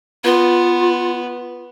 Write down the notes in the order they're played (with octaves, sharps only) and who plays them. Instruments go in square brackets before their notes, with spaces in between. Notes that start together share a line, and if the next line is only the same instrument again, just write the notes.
[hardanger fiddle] B3 [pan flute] F4